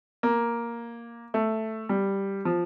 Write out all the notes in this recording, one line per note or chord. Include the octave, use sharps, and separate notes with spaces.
A#3
A3
G3
F3